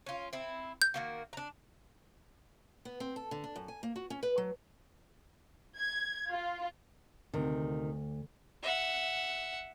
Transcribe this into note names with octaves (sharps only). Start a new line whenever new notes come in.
C#4 F4
C4 E4
G6
D#3 A#3 F#4
D4 A#5
B3
C4
A4
D3
D4
F#2
G#5
A#3
F#4
C#4
B4
F#3
G#6
F4
D2 C3 D#3
E5 F#5